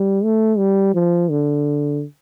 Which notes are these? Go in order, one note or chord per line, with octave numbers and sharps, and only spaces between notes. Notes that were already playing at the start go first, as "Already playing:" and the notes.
Already playing: G3
A3
G3
F3
D3